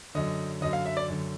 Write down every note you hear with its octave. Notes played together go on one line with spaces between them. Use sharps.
F#2 D3 D#5
F#2 D3 D#5
F5
E5
D5
F#2 D3